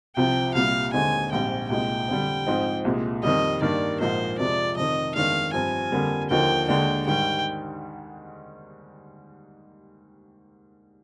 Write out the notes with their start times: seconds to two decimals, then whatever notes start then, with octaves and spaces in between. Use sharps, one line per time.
0.16 C2 C3 F3 G5
0.55 C2 A#2 G3 F5
0.93 D#2 D3 G#3 C4 D#4 G#5
1.32 A#1 G#2 G3 C4 G5
1.70 C2 A#2 G#3 D#4 G5
2.08 F2 D3 G3
2.47 G#2 F3 C4 D#4
2.85 C2 A#2 G#3
3.23 F2 D#3 G3 D#5
3.61 G2 D#3 A#3 D4 D5
4.00 A#1 G#2 F3 A#3 D#4 C5
4.39 F2 C3 F3 G#3 D5
4.76 F1 F2 D#3 D#5
5.15 G1 F2 D#3 G#3 D4 F5
5.53 G2 F3 C4 G#5
5.92 F2 D3 G3 A#3
6.30 D#2 D3 F3 A#3 D#4 G5
6.68 D#2 D3 G#3 D4 G5
7.07 G#2 D#3 G3 G5